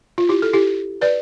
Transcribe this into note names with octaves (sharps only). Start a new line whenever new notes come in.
F4
E4 G4
A4
E4 G4
B4 D5